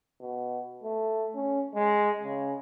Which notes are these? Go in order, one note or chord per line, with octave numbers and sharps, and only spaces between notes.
B2
A3
C#4
G#3
C#3